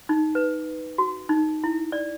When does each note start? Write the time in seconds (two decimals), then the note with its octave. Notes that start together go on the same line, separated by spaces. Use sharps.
0.09 D#4
0.35 B4
0.98 F#4
1.29 D#4
1.64 E4
1.92 D5